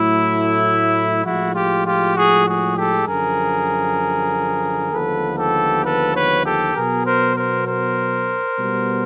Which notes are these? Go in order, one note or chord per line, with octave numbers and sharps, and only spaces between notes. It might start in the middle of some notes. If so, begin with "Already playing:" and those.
Already playing: A2 F#3 A3 E4
A2 F3 G#3 E4 F#4
F4 G4
F4 G4
F#4 G#4
F#4 G#4
G4 A4
F#2 D3 F3 G#4 A#4
D#2 D3 F3 G#3 B3 A4 B4
G4 A4
A4 B4
B4 C#5
G4 A4
B2 F#3 B3 G#4 A#4
A#4 C5
A#4 C5
A#4 C5
B2 G3 B3